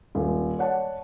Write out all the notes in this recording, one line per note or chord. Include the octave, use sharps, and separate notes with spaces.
D#1
C#5 D5 F#5 A5